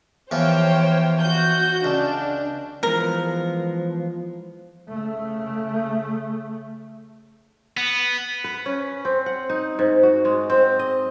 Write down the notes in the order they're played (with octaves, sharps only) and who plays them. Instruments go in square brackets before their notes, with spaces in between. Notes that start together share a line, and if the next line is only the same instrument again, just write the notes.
[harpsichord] E2 F3 [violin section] C5 C#5 G5
[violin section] F#4 G6
[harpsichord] C#2 [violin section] D4
[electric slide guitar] E3 G#3 B3 [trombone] F3 [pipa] A#4
[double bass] C#3 A3
[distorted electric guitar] B3
[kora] B4
C#4
C4
F#5
D#4
G#2
F#4
G#3
C4
D#5